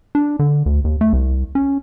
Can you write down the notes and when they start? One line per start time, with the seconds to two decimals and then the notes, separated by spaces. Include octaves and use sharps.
0.15 D4
0.39 D3
0.66 D2
0.84 D#2
1.01 A3
1.13 C2
1.55 C#4